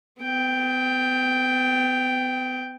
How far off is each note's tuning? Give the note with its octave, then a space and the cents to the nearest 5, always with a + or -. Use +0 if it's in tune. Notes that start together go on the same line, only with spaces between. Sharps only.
B3 +45 G5 +0